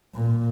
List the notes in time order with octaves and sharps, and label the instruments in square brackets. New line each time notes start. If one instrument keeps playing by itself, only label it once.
[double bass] A#2